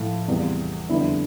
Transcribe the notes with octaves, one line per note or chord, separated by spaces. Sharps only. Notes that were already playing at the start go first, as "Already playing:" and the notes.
Already playing: A2 F3 A3 E4 F5
E2 C3 G3
F2 D3 G3 B3 E4 E5